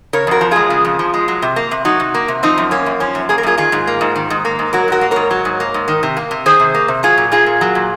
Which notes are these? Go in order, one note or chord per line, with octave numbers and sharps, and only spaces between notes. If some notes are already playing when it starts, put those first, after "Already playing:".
C#3 A#4 C#5
F2 F#4 A#4
F3
G#3 F4 G#4
C#3
F2
F3
G#3
F#3
C3
A#3
C3
F#3 D#4 F#4
C3
A#3
C3
F3 C4 D#4
F#2
A#3 C#4
F#2
F3 C#4
F#2
A#3 G#4
A#4
F#2 F4 G#4
D#3 F4 G#4
G#2
A#3
G#2
D#3
G#2
A#3
G#2
F#3 F#4 A#4
G#2 F#4 A#4
A#3
G#2 A#4 C#5
F#3
G#2
A#3
G#2
D#3
C3
A#3
C3
D#3 G#4 C5
C3
A#3
C3
F#3 F4 G#4
A#2
A#3 F4 G#4
A#2
F#3
A#2